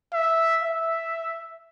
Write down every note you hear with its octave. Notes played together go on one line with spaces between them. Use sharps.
E5
E5